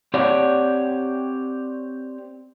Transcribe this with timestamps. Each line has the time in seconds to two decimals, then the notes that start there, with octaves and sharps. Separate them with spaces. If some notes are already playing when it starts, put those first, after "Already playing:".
0.14 C4 G4 C#5 D5 F#5